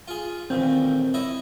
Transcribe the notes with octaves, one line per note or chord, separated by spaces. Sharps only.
F4 G#4
A1 D#2 A#2 C4
E4 C#5 D#5